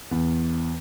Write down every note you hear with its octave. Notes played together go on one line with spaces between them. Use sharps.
E2